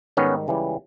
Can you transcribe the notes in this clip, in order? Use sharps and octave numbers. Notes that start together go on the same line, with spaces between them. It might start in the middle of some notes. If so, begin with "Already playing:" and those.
G#2 D#3 G3 B3 C#4
C#2 C#3 E3 G3